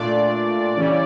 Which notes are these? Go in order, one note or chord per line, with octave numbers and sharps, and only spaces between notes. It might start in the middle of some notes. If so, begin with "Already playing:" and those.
Already playing: A#2 A3 D4 F4 D5
C#3 E3 G3 C#4 E4